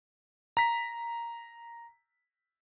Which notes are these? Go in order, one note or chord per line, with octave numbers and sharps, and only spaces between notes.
A#5 B6